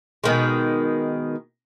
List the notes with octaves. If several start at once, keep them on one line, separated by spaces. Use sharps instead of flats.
B2 D#3 G#3